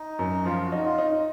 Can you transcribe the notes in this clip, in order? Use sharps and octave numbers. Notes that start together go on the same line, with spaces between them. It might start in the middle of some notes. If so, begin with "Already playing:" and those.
Already playing: D#4
F#2
F3 F4
F#4
D#4
F4
D#4